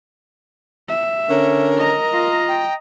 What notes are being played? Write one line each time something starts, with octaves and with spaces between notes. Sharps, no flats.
E5
D3 C#4 A#4
D#5 A#5
F4
G5